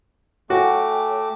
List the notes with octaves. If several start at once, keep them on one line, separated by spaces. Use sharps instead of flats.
A3 F#4 C#5 G5 G#5 D6